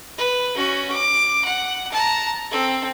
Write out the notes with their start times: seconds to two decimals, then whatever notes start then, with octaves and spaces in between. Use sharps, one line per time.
0.18 B4
0.55 C#4 F#4
0.92 D6
1.45 F#5
1.92 A5 A#5
2.51 C4 A4